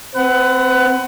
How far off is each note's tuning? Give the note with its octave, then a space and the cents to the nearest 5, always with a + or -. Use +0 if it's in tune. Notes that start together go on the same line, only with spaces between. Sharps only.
C4 -10 B4 +25 F#5 +20